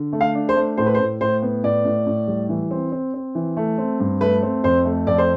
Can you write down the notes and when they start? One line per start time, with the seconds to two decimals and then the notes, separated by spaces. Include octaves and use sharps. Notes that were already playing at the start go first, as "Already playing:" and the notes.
Already playing: D3
0.13 A3
0.21 F5
0.35 D4
0.49 C5
0.56 A3
0.77 A2 C5
0.86 B4
0.94 C5
0.99 A2
1.21 A2 C5
1.42 B3
1.64 A2 D5
1.85 A2
2.06 A2
2.28 G3
2.49 E3
2.71 C4
2.92 C4
3.14 C4
3.35 E3
3.57 A3
3.78 C4
4.00 G2
4.21 A3 B4
4.42 C4
4.64 F2 C5
4.85 A3
5.07 F2 D5
5.18 C5